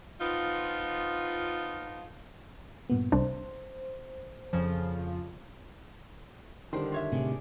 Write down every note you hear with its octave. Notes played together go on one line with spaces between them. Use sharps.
F3 B3 D#4 F4
G2 A#2 B3
C2 D4 C5
F2 C#3 F3
D3 D#3 G3 D4 G4 C5
F4 C#5 E5
A2 C3 G#4 D5